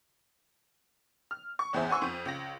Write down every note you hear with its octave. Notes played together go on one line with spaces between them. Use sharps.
F6
C#6
A1 E2 G#4 C5 E5
F#5 G#5 C6 C#6 E6
F2 G6 D#7
C#2 A#6